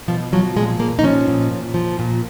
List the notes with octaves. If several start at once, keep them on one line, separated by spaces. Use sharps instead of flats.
B2 F3
F3 F#3
A#2 G#3
A#2 A#3
D#4
F3 C#4
A#2
A#2
F3
A#2